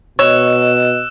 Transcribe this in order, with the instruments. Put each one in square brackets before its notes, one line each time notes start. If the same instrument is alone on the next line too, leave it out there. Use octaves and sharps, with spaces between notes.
[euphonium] B2 [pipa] C#5 [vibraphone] D#5 [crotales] E6 F#6 E7